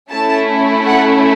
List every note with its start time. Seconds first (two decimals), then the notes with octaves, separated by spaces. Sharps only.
0.11 A3 C#4 E4 A5
0.86 F#5